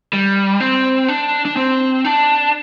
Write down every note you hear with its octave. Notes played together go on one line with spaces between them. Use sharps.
G3
C4
D4
D4
C4
D4